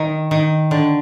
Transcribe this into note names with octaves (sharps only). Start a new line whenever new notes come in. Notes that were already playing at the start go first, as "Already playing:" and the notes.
Already playing: D#3
D#3
D3